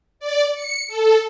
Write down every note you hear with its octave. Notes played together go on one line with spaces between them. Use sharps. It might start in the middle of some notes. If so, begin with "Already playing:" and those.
D5
C#7
A4